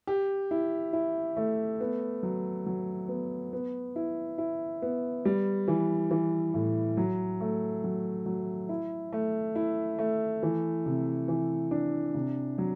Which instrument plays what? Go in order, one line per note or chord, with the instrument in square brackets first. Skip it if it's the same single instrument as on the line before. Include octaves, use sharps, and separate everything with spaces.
[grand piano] G4
E4
E4
A3
B3
F#3
F#3
B3
B3
E4
E4
B3
G3
E3
E3
A2
F#3
A3
F#3
F#3
E4
A3
E4
A3
E3
C3
E3
D4
C3
F#3